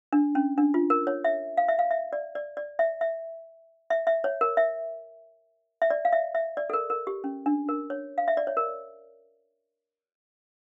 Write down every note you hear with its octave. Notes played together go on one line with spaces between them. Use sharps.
D4
C#4
D4
F4
A#4
C#5
E5
F5
E5
F5
E5
D5
D5
D5
E5
E5
E5
E5
C#5
A#4
E5
E5
D5
F5
E5
E5
D5
A4
A#4
A#4
G4
C#4
D4
A#4
C#5
F5
E5
D5
C#5
A#4